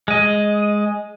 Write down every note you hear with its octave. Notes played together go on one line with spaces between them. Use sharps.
G#3 D#5